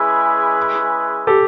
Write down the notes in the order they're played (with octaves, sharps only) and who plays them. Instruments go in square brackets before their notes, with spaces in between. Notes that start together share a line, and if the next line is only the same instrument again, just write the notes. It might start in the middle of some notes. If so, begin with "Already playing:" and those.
Already playing: [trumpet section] G#3 C#4 E4 G#4 B4
[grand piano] G4 A4